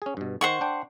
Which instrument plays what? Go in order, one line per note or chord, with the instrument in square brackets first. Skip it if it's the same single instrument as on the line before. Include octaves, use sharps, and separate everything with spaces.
[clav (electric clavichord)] C#4 G#4
G2 B2
[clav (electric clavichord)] D#3 [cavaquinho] C5 F#5 C#6
[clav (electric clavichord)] D4 G5